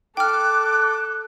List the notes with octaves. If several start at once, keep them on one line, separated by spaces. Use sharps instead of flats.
A4 G5 D6 F6 F#6